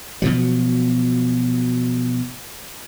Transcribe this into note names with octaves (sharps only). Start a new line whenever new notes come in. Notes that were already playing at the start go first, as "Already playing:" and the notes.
B2 F3 F#3